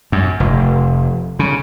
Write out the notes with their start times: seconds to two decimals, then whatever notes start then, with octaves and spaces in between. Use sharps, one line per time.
0.12 F#2
0.40 F1
1.39 C#3